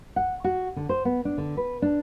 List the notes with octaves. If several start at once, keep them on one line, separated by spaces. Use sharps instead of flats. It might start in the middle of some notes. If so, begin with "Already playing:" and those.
F#5
F#4
D3
C5
B3
D4
D3
B4
D4